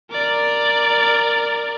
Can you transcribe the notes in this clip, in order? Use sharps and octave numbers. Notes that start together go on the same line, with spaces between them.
A#4 D5